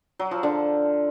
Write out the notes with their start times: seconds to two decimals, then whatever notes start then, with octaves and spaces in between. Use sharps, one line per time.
0.19 F#3
0.31 F3
0.43 D3